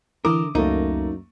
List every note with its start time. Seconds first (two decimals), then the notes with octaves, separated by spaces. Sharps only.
0.25 D3 E3 E4 A#4 D6 D#6
0.55 C#2 F#2 A3 A#3 D#4